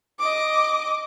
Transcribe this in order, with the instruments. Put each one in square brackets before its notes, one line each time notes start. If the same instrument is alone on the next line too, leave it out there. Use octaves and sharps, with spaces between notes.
[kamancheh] D#5 D6